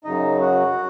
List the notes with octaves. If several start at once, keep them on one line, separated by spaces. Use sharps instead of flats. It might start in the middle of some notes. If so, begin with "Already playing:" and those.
F#2 C#3 F#3 D#4 D#5
F#4 F#5